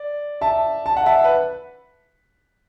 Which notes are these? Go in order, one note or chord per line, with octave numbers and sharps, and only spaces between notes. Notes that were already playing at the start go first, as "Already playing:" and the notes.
Already playing: D5
E5 A5
A5
F#5
E5 A5
B4